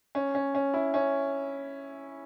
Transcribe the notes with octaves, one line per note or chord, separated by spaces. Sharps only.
C#4
C#4
C#4
E4
C#4